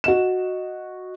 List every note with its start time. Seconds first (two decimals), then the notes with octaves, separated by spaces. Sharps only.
0.04 F#4 D#5 E7